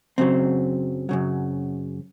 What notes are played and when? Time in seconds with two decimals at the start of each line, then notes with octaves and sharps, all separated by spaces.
0.18 F#2 C#3 F#3 C4
1.09 F#2 C#3 F#3